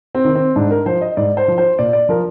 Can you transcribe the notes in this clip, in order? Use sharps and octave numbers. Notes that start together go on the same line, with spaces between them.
C4
D#3
C4
G#2 D4
A#4
F3 C5
D#5
G#2 D5
C5
F3
C5
A#2 D5
D5
F3 A#4